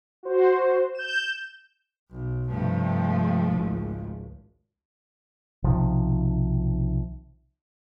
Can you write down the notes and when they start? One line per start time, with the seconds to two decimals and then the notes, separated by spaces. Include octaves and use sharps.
0.23 F#4 C5
0.95 G6 E7
2.11 B1
2.49 G2 C3 F3 A3
3.49 G#1 C#2
5.64 B1 C3 D#3 F3